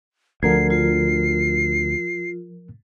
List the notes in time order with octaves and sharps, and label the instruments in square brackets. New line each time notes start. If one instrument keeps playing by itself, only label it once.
[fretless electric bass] D2 D3 [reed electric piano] F3 A#4 G#6 [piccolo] C7
[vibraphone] F4 [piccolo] C7